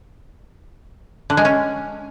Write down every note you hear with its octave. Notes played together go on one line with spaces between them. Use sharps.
D3
G#3
C#4